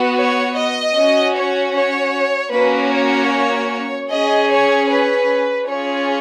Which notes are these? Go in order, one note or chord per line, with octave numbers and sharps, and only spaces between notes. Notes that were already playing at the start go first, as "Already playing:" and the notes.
Already playing: B3 F#4
C#5
D#5
C#4 F#4
C#5
C#5
A#3 C#4 F#4 B4
C#5
C#4 G#4 D#5
C#5
B4
C#4 F4 G#4 C#5